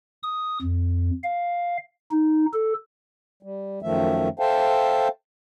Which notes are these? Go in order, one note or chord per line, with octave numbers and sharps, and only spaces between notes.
D#6
F2
F5
D#4
A4
G3
F#2 D#3 F3 A3 E5
A4 C5 E5 F5 G5 A5